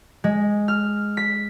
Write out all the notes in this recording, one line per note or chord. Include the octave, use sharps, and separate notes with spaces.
G#3
F6
B6